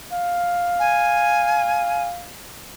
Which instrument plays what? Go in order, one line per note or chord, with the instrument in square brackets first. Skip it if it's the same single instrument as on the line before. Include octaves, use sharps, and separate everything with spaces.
[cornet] F5
[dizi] G#5